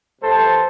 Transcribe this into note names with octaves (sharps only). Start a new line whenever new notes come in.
C3 E3 A3 A4 C5